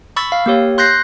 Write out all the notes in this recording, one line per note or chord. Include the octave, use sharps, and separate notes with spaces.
B5 C#6 E6 A6
F5
A#3 G4 C#5
C6 F#6 G6 A#6 C7